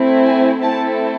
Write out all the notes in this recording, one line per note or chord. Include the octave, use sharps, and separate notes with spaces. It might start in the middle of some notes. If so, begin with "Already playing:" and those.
Already playing: A3 C4 E4
G#5
A3 C4 E4 A4 A5